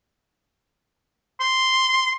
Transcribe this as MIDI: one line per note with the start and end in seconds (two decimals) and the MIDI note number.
1.41 2.13 84